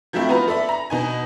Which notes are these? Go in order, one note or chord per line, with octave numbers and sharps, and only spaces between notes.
F3 F#3 A3 C4 E4
B3 F4 B4 A#5
A4 D5 E5 B5
A#5
B2 D#4 G#5